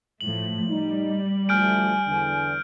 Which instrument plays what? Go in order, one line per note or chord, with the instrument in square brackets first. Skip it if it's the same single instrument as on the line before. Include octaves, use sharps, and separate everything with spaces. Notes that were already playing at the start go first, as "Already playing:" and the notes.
[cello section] A2 F3 A3 [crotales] F#7
[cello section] G3 [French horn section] D#4
[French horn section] D2 F3 A3 [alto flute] G#5 [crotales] F6 G6 D7
[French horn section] E2 D3